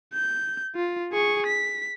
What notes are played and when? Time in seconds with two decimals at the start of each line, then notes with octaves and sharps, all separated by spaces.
0.14 G6
0.75 F4
1.12 G#4 C#6
1.46 B6